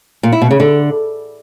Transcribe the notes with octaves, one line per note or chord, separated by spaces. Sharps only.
A#2
E4
B2
C#3
D3